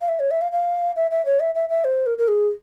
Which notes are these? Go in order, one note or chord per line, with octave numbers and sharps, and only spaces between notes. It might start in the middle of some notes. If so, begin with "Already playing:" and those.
F5
E5
C#5
E5
F5
F5
E5
E5
C#5
E5
E5
E5
C5
A#4
A#4
G#4